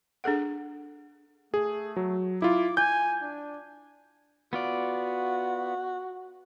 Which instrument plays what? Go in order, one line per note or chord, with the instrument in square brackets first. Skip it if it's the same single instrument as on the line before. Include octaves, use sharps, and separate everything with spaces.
[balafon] D4 G#4 A4 F#5
[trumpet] A3 [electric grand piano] G#4
[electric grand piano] F#3
[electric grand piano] E4 F4 [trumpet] D6
[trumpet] G#5 [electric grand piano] G6
[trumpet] D4
[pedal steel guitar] B3 F4 D5 [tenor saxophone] F#4